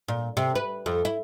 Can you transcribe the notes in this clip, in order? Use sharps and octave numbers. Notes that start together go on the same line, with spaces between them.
A#2
C3
B4
F2
E4